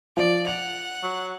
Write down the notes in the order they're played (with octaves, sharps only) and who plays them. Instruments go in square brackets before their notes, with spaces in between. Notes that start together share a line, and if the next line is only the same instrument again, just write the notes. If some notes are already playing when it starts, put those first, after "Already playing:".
[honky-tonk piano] F3 [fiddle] D5
[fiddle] F#5 [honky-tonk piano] F7
[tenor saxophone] F#3